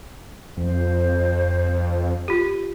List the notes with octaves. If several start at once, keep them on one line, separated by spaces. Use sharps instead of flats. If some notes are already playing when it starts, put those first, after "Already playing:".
F2 C5
F4 G4